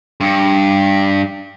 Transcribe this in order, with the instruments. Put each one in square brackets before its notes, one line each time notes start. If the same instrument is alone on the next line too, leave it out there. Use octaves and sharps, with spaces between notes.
[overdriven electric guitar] G2